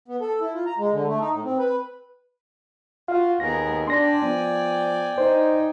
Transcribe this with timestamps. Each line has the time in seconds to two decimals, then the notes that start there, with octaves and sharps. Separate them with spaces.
0.08 B3
0.21 A4
0.41 E4
0.54 F4
0.66 A#5
0.78 G#3
0.92 D3
1.08 A3
1.20 D#4
1.32 A2
1.44 C4
1.58 B4
3.08 F4 F#4 F5
3.40 D#2 B3 G#4 A#4 A#6
3.87 D4 D5 G5 G#5 C6 A#6
4.22 F3 B3
5.18 D#4 C5